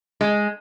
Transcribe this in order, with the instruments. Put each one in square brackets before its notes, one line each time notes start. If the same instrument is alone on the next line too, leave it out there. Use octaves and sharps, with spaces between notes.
[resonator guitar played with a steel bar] G#3